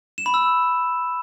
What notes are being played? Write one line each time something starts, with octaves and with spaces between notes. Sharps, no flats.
E7
B5
E6